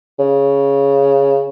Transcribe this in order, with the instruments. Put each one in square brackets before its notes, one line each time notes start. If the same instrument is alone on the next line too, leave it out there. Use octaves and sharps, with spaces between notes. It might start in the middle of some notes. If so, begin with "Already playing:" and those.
[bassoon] C#3